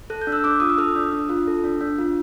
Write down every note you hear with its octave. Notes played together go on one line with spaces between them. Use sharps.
A4 F#6
G6
D4
E6 F#6
D4 D6 E6
F4 D#6
E6
A4 D#6 F6
D4
D4
F4
A4
D4
D4
F4